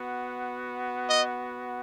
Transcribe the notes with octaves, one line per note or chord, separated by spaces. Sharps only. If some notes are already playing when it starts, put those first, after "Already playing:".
Already playing: B3 F#4
D#5